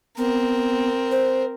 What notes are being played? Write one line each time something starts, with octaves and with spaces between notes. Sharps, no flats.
B3 C4 A#4
C5